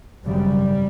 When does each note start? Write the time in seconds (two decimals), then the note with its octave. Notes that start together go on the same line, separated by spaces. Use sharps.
0.25 G#1 F#2 C#3 G3